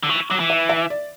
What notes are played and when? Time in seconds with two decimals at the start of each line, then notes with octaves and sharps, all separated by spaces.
0.03 D3
0.09 E3 C#6
0.30 F#3 D6
0.40 E3
0.50 E5
0.69 E5
0.90 D5